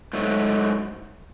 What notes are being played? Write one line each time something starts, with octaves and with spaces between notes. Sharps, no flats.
G#2 F#3 A3